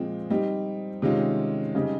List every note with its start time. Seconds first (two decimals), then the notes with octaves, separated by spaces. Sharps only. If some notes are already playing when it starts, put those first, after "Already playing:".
Already playing: A#2 F3 G#3 C4
0.30 G3 C4 D#4
1.02 C3 D#3 G#3 C#4 F4
1.75 C#3 G3 C4 D#4